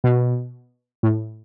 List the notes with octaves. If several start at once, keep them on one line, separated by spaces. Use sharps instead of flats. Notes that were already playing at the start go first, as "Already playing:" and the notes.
B2
A2